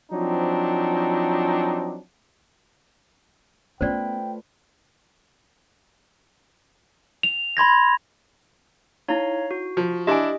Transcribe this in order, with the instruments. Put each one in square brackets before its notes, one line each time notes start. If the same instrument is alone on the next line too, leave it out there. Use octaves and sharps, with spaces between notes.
[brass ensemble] F3 F#3 C4 D4 D#4
[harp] A3 F4 B4 [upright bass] B3 C#4 [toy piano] C5 D5 [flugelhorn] G5
[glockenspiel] F7
B5 C6 G#6 A#6
[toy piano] D#4 E4 [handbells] C#5 F5 A#5
[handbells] F#4
[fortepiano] F3
[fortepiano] D4 E4 [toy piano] G4 G#5 [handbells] D#5